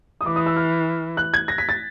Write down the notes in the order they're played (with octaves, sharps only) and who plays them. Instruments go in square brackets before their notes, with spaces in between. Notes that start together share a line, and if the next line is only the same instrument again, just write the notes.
[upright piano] D#6
[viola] E3 [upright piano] D6
[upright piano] D#6
E6
F6
F#6
G#6
A#6
B6
A6